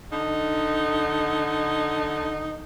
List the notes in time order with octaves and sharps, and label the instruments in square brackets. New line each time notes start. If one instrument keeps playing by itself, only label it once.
[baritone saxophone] D3 [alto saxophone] D#4